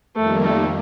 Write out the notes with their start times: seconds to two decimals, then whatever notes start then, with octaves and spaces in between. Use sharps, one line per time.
0.16 F2 D#3 G3 A3 A#3
0.44 A3